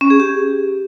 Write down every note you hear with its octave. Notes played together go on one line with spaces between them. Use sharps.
C#4
G#4
G4